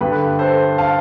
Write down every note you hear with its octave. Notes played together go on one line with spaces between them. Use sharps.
G2 D3 G4 B4
A4 C5
F5 A5